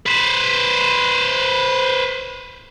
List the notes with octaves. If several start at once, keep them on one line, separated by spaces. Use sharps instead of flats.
B4 C5